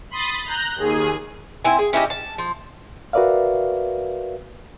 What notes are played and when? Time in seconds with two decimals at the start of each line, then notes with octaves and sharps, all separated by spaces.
0.10 B5 C6 D#6 A6
0.45 A#5 F#6 G6
0.76 D#2 G#4
1.65 C4 E4 G#5
1.79 G#4
1.93 C#4 E4 G4 D#5
2.10 A5
2.38 F3
3.13 F#4 A#4 B4 D5 E5 F5